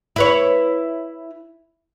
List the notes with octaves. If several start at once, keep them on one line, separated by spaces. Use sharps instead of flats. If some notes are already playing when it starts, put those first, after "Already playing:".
E4 B4 C#5